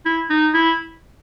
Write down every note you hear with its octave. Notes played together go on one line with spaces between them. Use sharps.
E4
D#4
E4